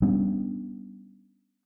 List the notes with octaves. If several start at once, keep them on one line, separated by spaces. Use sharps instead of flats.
G3 B3 C#4 D4